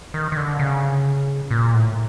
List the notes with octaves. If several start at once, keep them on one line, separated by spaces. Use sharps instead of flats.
D#3
D#3
D3
C#3
A#2
A2